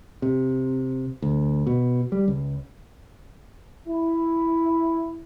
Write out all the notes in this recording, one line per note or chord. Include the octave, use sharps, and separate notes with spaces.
C3
D2
B2
G3
C#2
E4